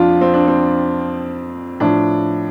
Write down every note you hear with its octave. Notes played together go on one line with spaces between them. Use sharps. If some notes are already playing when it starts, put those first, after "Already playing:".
Already playing: F2 F3 D4 F4
C4
D4
C4
A2 F3 D4